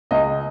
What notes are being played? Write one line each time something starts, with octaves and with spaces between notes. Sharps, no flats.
C#2 D#5